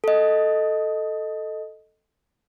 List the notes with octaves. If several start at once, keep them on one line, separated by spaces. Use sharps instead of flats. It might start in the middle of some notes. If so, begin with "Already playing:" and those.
A4 D#5